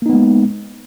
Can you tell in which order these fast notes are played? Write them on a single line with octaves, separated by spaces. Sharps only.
A#3 D#4 B3 G#3